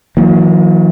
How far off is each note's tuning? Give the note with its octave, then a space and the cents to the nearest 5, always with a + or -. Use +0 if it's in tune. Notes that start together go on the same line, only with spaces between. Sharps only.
D#3 +45 F#3 -45 A#3 +0